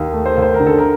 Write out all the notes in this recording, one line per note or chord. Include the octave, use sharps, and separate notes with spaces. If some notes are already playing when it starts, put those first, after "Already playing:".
Already playing: D#2
A3
C5
D#2
C5
A#4
D3
A4
A#4